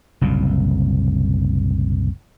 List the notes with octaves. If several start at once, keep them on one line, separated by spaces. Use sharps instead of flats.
F#1 C2 A#2